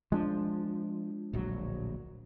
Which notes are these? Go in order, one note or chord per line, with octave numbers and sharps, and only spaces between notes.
F3 G#3 D4
D1 A#1 F#3